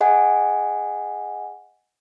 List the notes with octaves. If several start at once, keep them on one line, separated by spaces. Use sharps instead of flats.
G#4 D#5 F#5 G#5